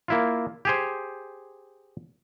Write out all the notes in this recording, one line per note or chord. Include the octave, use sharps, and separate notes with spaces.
A#3 E4 F4
G4 G#4 C5